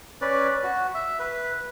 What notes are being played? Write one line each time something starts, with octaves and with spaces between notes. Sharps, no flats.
C#4 B4 D5
F#4
E5
B4